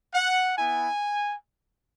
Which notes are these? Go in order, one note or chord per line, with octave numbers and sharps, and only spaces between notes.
F#5
B3 E4 G#5